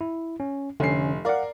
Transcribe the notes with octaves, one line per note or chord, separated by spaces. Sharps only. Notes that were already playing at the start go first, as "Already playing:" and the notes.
E4
C#4
F1 D3 C#4 C7
A#4 D5 F5 F#5